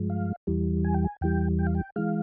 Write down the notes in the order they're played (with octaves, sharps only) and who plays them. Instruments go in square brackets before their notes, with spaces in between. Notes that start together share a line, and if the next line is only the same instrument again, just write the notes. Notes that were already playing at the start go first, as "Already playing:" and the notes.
Already playing: [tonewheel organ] G2 F3 G#3
F5
E2 E3 G3
G#5
G5
G#5
E2 E3 G3 G5
G5
F5
G5
E3 G#3 F5